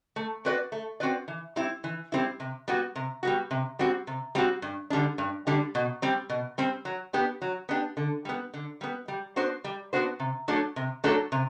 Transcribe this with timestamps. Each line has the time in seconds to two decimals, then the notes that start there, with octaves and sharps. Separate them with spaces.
0.16 A3
0.45 C4 F#4 B4 D5
0.72 A3
1.00 C4 F#4 B4 D5
1.28 E3
1.56 G3 C4 E4
1.84 E3
2.12 G3 C4 E4
2.40 C3
2.68 G3 B3 F#4
2.96 C3
3.23 G3 B3 F#4
3.51 C3
3.79 G3 C4 F#4
4.07 C3
4.35 G3 C4 F#4
4.62 G2
4.90 D3 G3 D4
5.18 G2
5.47 D3 G3 D4
5.75 B2
6.02 G3 C4
6.30 B2
6.58 G3 C4
6.85 F#3
7.13 B3 D4 G4
7.42 F#3
7.69 B3 D4 G4
7.97 D3
8.25 G3 B3
8.54 D3
8.81 G3 B3
9.08 G3
9.36 B3 D4 F#4 C5
9.64 G3
9.93 B3 D4 F#4 C5
10.20 C3
10.48 F#3 A3 D4 A4
10.76 C3
11.04 F#3 A3 D4 A4
11.32 C3